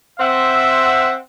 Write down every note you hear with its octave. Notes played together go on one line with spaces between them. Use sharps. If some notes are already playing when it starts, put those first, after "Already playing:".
C4 E5 F#5